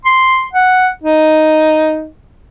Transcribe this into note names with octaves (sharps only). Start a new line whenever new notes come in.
C6
F#5
D#4